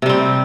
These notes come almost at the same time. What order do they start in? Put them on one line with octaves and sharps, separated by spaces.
C3 G3 C4